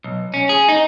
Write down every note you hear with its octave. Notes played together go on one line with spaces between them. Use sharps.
B1
C#4
G#4
D#4